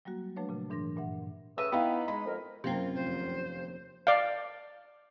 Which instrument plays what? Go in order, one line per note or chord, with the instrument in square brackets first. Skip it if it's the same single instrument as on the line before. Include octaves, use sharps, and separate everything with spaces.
[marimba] F#3 G3 A#3 F#4
F3 F#3 A3 D4 B4 C#5
A#2 C#3
G#2 E3 D4 A#4 C6 A#6
G2 A#2 E5 F#5
[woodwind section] C#3 A3 D#6 [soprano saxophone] B4 [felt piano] E6
[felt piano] B3 E4 F5 [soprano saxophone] D#4 [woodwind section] G4 B5
[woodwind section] G#3 [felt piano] B5
[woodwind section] F2 A#4
[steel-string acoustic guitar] F#2 F4 [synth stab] C3 A#3 C4
[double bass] F1 D#2 [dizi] C5
[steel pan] D5 F5